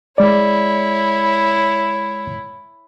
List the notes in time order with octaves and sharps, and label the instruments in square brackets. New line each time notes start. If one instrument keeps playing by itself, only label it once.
[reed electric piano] G#3 D5 [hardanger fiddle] E4 C#5